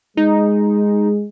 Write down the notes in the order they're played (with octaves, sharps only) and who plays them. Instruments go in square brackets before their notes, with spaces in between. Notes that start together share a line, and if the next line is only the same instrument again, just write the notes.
[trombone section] G#3 [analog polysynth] D#4